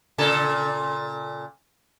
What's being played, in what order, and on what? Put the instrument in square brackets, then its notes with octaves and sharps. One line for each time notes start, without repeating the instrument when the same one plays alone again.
[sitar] A#2 C#3 A4